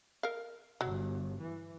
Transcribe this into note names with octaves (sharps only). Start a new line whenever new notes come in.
A#4 F5
G1 F#3
E3